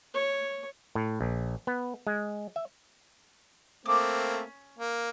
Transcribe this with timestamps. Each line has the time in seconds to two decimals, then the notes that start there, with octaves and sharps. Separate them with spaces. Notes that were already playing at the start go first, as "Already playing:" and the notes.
0.14 C#5
0.95 A2
1.21 A#1
1.67 B3
2.07 G#3
2.56 E5
3.86 A3 A#3 C4 D6 D#6
4.29 C#4
4.79 A#3